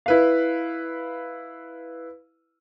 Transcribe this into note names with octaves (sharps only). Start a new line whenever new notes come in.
E4 B4 F5